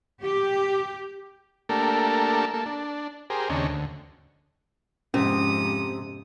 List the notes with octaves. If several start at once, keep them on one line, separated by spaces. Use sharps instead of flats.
G4
A3 A#3 D4 G4 A4 A#4
A#3 A4
D4
G4 G#4 A#4 C5
D#2 C#3 C4 D4 C#5 D#5
D2
F2 G#2 C3 C#4 D#6